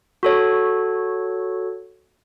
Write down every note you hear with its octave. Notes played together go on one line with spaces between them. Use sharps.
F#4 A4 C#5